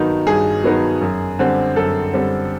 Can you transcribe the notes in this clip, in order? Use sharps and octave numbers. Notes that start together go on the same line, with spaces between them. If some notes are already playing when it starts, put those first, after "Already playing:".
Already playing: G2 D#3 F#3 B3 D#4
G2 G#4
D#3 F#3 B3 D#4
F#2
D3 G3 C4
F#2 A4
D3 G3 C4